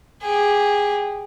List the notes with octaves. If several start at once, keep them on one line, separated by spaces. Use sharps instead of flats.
G4 G#4